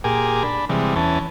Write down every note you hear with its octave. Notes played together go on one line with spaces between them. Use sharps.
A#2 G4 G#4 A#4 G#5 D6
D4 B5
C3 E3 G3 G#3
E2 E3 C#4 A5